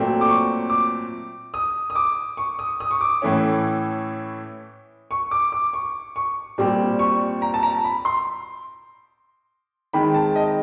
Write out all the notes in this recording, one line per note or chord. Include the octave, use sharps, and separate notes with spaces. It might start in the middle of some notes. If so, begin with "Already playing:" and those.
Already playing: A#2 F#3 A3 C4
D6
C#6
D6
D#6
D#6
D6
C#6
D#6
D#6
C#6
D6
A2 E3 A3 C#4
C#6
D6
D6
C#6
C#6
A#2 G3 C4
C#6
A#5
A5
A#5
B5
C6
D#3 G#3 C4 B5
A5
D#5